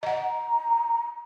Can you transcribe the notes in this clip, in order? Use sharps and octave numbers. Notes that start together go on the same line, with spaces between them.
D#5 F#5 A#5